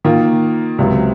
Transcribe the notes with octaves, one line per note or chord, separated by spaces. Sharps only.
D#3 A#3 F4
C#2 C3 F#3